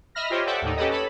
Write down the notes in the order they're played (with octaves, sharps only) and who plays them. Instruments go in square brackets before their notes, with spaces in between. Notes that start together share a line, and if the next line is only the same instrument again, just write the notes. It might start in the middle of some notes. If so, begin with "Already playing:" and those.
[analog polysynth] D#5 E5 B5 F6 A#6
F4 G4 C5 C#5 D#5 E5
A4 D5 E5 F#5 G5 A5
D#2 A2 D#4
C#4 G4 A4 B4 C#5 D#5
A4 C#5 B5